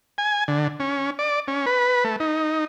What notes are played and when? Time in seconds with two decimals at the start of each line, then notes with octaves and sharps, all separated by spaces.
0.18 G#5
0.48 D3
0.80 C#4
1.19 D5
1.48 C#4
1.66 B4
2.04 A3
2.20 D#4